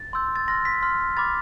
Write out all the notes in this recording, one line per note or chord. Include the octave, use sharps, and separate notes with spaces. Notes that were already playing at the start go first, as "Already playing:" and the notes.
Already playing: A6
C6 E6 G6
A6
C6 F6 A#6
B6
C6 F6
B5 D6 F6 A6